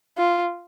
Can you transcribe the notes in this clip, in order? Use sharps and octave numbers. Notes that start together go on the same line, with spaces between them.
F4